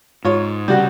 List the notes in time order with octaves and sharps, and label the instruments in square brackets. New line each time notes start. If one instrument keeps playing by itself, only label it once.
[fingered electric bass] G#2 [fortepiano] F4 C#5
[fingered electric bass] C2 C#3 [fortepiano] G3 F#4